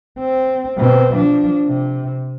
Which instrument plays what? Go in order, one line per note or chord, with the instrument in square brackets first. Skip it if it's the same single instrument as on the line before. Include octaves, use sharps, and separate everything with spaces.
[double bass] C4
B2 C4
F3 D4
C3